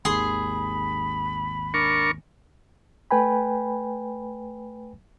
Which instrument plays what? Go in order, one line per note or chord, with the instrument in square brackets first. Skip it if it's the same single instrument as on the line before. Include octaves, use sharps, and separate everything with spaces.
[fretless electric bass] G#1 D#2 [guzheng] G#4 C6 [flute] B5
[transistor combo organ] D4 A#4 C#6
[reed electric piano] A3 B4 G5 G#5 B5